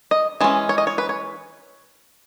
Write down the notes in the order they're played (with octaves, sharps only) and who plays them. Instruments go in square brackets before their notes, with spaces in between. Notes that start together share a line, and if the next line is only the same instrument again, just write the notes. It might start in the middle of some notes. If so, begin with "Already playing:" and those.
[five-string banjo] D#5
E3 G#3 C#4
C#5
D#5
C#5
B4
C#5